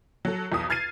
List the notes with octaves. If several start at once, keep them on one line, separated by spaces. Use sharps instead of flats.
F#3 A4
B1 E2 D#6
F6 G#6 A6 C7 D#7